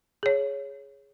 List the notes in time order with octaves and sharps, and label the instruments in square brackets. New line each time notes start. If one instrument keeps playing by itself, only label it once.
[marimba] G#4 C#5